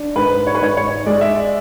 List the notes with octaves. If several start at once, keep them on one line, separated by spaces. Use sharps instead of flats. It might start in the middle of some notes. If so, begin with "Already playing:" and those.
Already playing: D4
G#2 B4
C#5
B4
G#2 C#5
C#5
G#3 D5
E5
D5